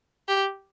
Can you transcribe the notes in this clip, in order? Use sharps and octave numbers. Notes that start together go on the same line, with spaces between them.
G4